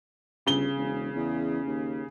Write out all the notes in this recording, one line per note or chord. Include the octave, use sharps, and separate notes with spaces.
G1 C#3 G7
E1
E2
D#2